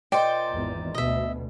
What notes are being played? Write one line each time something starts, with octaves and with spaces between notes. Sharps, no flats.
A#2 D#4 C5 D5 G5
G#1 E2
D2 B2 D#5 E5